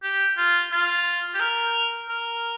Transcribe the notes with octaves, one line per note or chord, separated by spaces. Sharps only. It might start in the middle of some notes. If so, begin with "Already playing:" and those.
G4
F4
F4
G4
A#4
A#4